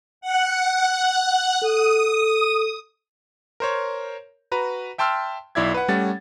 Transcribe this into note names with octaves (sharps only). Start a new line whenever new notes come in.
F#5
A4 D#6
A#4 C5 C#5
F#4 B4 A#5
E5 G5 A5 C6 E6 F6
B1 E4 D5 E5 G#6
B4 F#5
G3 A3 C#4 F#5 A6